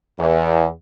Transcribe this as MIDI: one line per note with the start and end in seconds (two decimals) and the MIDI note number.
0.19 0.68 40